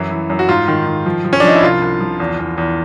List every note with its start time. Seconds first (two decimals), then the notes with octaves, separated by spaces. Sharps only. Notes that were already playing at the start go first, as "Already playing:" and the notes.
Already playing: F#2 E3 E4
0.11 E3
0.30 F#2
0.39 F#4
0.49 G#2 F4
0.68 D#3
0.86 D#3
1.06 F3
1.25 F3
1.33 C#4
1.40 D4
1.44 F3 D#4
1.55 E4
1.63 C2 F4
1.82 C2
2.01 F3
2.20 E2
2.39 E2
2.58 E2